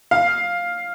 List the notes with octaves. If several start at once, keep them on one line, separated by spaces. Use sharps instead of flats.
F5